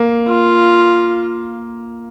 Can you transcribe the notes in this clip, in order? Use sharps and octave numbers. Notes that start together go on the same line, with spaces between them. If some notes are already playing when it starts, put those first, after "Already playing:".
Already playing: A#3
F4